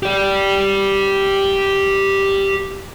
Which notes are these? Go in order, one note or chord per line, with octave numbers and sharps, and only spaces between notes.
G4 D5